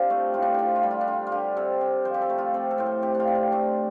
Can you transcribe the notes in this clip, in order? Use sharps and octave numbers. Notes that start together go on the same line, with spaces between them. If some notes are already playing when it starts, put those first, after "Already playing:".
Already playing: C3 C4 D4 F4 G4
A3
A2 F4
D4
C4 F4 G4
F4
G3
F4
D4
D3 F4
F4
D3 G4
C3 A4
C4
F3 C5
G4
A4
A3
F4
C4 A4
A4
A2 C5
A4
C3 G4
D4
F4
C4
F4
A3 D4